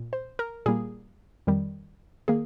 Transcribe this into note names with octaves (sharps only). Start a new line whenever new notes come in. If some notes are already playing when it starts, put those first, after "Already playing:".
Already playing: A#2
C5
A#4
A#2 G3 A#3 G#4
F2 D#3 G3
D#3 A#3 G#4